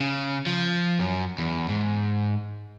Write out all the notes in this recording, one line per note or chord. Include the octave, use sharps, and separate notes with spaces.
C#3
F3
F#2
E2
G#2